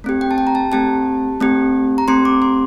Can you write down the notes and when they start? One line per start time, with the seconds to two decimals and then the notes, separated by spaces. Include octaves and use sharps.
0.04 A3 C4 G4
0.21 G5
0.31 A5
0.38 G5
0.47 A#5
0.55 A5
0.72 A3 C4 G4 A5
1.40 A3 C4 G4
1.98 A#5
2.08 A3 C4 G4 C6
2.25 D6
2.42 C6